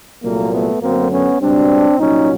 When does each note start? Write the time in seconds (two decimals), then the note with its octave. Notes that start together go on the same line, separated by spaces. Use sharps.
0.23 C2 A#2 F#3 A3 A#3
0.52 A3 B3
0.81 F#2 D3 F#3 A3 A#3 C4
1.11 B3 C#4
1.40 C#2 B2 G3 C4 D4
1.98 C2 A#2 F#3 C#4 D#4